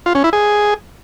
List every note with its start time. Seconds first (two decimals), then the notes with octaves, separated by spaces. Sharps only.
0.06 F4
0.15 C#4
0.24 E4
0.33 G#4